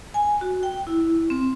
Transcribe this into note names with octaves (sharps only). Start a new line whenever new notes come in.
G#5
F#4
G5
E4
C4